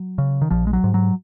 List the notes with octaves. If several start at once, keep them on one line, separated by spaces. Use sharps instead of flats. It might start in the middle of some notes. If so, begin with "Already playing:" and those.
Already playing: F#3
C#3
D#3
A#1 F3
G#3
F#3
G#2
F#3